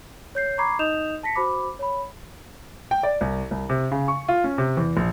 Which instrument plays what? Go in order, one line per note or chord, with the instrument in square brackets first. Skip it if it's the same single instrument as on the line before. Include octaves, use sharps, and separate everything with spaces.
[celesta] C#5 G6 C7
A#5 B5 C#6 D6 G#6 C7
D#4 D#5 D#6 G6 E7 F7
A5 A#6 B6 C#7
F#4 C5 B5 D6
C#5 B5
[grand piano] G5
D5
C2
C2
C3
C#3
C#6
F4
C#4
C3
E2
A#1